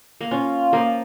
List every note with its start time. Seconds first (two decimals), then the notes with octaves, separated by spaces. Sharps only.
0.21 A#3
0.31 C#4 F4
0.73 F3 A#3